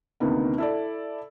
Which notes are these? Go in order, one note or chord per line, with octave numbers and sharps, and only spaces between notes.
D2 C3 D#3 A#3 B3
E4 A4 D5